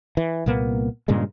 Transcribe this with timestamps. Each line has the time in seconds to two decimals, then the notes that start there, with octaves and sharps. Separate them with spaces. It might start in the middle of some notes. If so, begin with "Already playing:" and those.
0.17 E3
0.46 C2 A#2 A#3 B3
1.08 G2 A#2 C#3 G#3